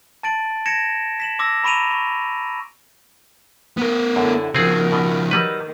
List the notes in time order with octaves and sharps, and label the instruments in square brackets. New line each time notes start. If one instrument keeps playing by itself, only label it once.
[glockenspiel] A5 A6 D7 F#7
G#6 A#6 C#7 D7 E7
B6 E7 F#7
C6 D6 E6 A#6
A#5 B5 C#6 D7 D#7 F7
C#6
[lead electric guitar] B3 A#4
[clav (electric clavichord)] F#2 [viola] D3 E4
[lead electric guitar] C#3 F3 [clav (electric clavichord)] C4 G#4 [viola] F#4 A#4
[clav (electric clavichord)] B2
[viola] D#3 [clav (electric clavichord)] F#3 G3 B4